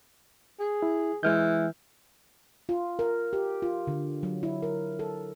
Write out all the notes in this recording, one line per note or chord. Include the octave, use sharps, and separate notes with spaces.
G#4
E4
E3 G#3 F6 G6
F4
A#4
G4
F4
D3
F#3
E4
A#4
A4